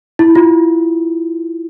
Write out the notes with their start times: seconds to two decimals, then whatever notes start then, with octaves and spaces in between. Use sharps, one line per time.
0.19 E4
0.35 F4